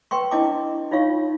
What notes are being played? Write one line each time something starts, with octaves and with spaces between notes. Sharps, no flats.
B4 G5 C6 C#6
D4 E4 D#5 A5 D6
D#4 F4 C#5 F5 C#6